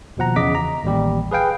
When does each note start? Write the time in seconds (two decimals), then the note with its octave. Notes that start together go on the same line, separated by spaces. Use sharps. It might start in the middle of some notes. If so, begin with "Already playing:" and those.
0.17 D#2 B2 F3 F#5 A#5
0.36 E2 C#3 D#5 D6 B6
0.55 A#5
0.84 A1 D#2 G3 G4
1.31 G#4 B4 F5 G5